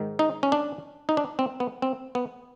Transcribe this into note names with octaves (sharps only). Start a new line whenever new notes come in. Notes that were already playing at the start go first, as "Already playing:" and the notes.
Already playing: G#2 D#3
D#4
C#4
D4
D#4
D4
C4
B3
C4
B3